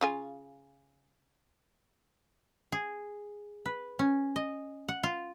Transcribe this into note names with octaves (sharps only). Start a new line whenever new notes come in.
C#3 F4 G#5
G#4
B4
C#4
D#5
F#5
F4